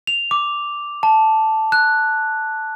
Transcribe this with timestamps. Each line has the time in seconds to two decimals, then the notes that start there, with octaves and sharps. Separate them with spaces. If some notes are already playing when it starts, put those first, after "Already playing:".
0.07 F7
0.31 D6
1.03 A5
1.72 F#6